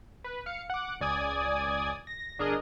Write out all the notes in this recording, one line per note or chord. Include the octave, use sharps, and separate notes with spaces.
B4
F5 C#7
F#5 D6
C#2 D5 G#5 D#6 G#6
A#6
G1 D4 G#4 A#4 D#5